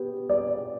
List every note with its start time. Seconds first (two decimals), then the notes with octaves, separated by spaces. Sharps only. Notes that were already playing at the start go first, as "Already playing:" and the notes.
Already playing: B3 G4
0.29 D5